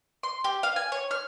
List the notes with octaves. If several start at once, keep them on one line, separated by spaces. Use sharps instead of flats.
C6
G4
F5
G#5
C#5
F6